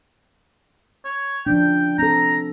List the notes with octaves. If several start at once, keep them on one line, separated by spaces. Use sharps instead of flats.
C#5
F3 C#4 D4 G5
C4 A4 A#5